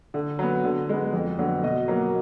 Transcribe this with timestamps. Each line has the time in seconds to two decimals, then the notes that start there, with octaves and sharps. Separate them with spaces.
0.14 D3
0.39 F#3 B3
0.64 D3
0.89 G#3 B3
1.13 F2
1.38 D3 F#3 B3
1.63 B2 D#5
1.88 F#3 A#3